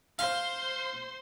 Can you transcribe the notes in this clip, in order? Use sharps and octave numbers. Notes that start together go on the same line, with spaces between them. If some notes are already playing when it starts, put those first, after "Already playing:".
C5 F5 C6